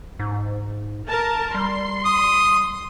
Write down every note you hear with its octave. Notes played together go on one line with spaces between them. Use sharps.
G#2
A#4 A5
G3 C6
D#6